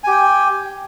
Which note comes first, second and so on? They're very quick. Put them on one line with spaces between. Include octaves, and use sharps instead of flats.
G#5 G4 G5